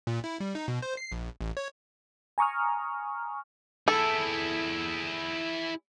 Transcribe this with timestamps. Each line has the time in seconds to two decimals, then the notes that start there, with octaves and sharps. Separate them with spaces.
0.07 A#2
0.24 E4
0.40 G3
0.55 D#4
0.68 B2
0.82 C5
0.97 C7
1.12 A#1
1.41 A1
1.57 C#5
2.38 G#5 A#5 C#6 D#6 F6
3.88 E4 G#4 A4